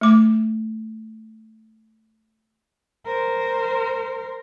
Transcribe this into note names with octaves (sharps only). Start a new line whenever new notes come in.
A3 D6
A#4 C5